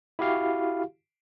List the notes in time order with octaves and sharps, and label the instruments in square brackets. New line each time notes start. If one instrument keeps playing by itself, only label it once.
[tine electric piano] E4 F#4 G4 F5